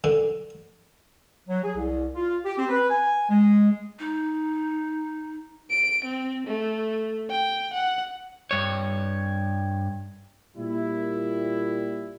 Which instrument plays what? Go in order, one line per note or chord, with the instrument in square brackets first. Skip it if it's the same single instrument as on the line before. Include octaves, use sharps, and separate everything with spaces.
[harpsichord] D3
[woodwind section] F#3
G#4
C2
F4
G4
C4
B4
G#5
G#3
[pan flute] D#4
[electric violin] D7
C4
A3
G5
F#5
[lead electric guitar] G2 C#5
[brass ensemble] A#2 G3 E4